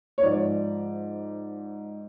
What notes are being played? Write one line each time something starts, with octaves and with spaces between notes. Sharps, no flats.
C#5
G#2 F3 D5